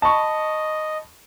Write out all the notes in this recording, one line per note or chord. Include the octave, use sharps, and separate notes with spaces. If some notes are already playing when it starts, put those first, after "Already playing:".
D#5 A5 B5 C#6